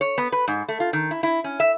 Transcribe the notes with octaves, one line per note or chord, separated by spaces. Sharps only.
C#5
B3
B4
G#2
A3
F4
D#3
E4
E4
C#4
E5